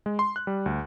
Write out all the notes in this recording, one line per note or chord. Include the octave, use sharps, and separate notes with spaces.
G#3
C6
F#6
G3
D2